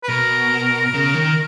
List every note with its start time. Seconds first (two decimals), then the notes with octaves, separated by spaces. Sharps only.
0.03 B4
0.09 B2 A#4
0.94 C#3
1.14 D#3